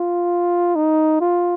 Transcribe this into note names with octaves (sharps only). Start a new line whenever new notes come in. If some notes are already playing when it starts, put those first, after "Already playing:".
Already playing: F4
D#4
F4